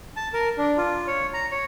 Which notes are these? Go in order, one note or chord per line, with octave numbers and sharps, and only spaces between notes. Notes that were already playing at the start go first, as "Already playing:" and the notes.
A5
A#4
D4
F4
C#5
A#5
C#5